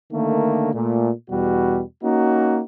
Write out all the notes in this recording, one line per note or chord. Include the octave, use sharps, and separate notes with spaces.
D3 D#3 A3 A#3
A#2 A3
E2 B2 G3 F#4
A#3 C#4 D#4 F#4